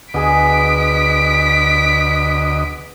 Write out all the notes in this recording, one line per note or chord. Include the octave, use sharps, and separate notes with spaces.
D2 B3 G#4 D#5 B6 D7